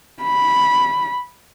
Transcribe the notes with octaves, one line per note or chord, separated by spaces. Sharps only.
B5